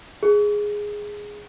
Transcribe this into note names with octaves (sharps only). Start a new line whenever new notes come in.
G#4